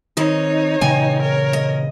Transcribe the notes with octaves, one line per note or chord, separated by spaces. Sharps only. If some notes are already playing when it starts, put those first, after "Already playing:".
D#3 C4 D#4 C#5 D#5
A#2 C#3 E3 D#5 G5 G#5
A#4 C#5
D#5